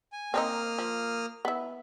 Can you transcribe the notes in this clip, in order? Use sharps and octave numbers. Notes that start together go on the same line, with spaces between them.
G#5
A#3 C4 D4 D#4 D#6 F6
F3
B3 E4